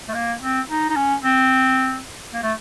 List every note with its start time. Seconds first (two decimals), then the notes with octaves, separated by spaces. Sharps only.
0.09 A3
0.14 A#3
0.42 C4
0.69 D#4
0.90 D#4
0.96 C#4
1.24 C4
2.33 A#3
2.43 A3